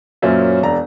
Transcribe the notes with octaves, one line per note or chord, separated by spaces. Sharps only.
F#2 A#2 C#4 C5 E5
E1 D4 A#5